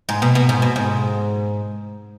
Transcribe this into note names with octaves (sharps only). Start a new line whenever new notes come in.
G#2
B2
B2
G#2
B2
G#2